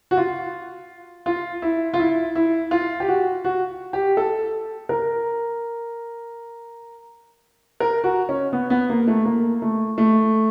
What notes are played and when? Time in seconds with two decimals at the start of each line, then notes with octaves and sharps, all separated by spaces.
0.11 F#4
0.17 F4
1.26 F4
1.62 E4
1.94 F4
1.99 E4
2.35 E4
2.71 F4
3.00 G4
3.08 F#4
3.45 F#4
3.93 G4
4.17 A4
4.89 A#4
7.80 A#4
8.04 F#4
8.29 C#4
8.53 B3
8.70 B3
8.90 A#3
9.08 A3
9.25 A#3
9.62 A3
9.98 A3